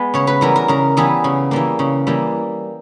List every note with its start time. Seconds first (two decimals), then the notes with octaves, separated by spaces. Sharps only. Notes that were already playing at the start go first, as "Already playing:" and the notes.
Already playing: G#3 B3
0.14 C#3 C#5
0.27 B4
0.41 E3 G3 B3 A#4
0.56 A#4
0.68 C#3 A#4
0.97 E3 G3 B3 G#4
1.24 C#3
1.51 E3 G3 A#3
1.79 C#3
2.07 E3 G3 A#3